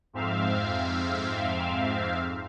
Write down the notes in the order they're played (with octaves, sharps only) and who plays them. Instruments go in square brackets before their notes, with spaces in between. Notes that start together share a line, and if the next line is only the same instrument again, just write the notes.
[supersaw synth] F2 G#2 C4 E5 F5